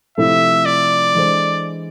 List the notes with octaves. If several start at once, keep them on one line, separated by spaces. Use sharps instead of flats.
C3 F3 A3 E4 A4 E5
D5
E3 G#3 D4 A4 C5